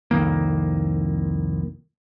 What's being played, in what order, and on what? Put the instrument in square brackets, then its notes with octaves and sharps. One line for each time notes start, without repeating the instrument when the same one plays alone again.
[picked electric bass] C2 F2 D#3 A#3